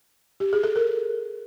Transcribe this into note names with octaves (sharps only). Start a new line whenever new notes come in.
G4
G#4
A4
A#4